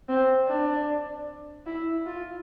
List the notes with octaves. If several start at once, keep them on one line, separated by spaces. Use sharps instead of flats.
C4
D4
E4
F4